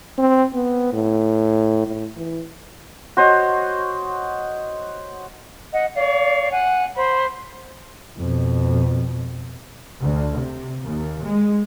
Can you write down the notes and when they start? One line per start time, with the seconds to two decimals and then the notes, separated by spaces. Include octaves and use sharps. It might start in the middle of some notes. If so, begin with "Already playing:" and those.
0.18 C4
0.54 B3
0.93 A2
1.87 A2
2.16 E3
3.17 F#4 C5 C#5 D#5
5.73 D#5 F#5
5.95 C#5 D5 F5
6.51 F#5 G#5
6.96 C5 B5
8.17 F2 B2
9.99 D2
10.36 C3
10.85 D#2
11.24 G#3